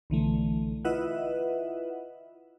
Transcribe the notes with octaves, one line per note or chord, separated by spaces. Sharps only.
B1 D3 E3 A3
E4 F4 B4 D#5 E5 F#5